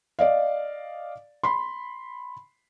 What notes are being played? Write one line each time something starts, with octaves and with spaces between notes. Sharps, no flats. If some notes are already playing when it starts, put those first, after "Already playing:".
D5 D#5 F5
B5 C6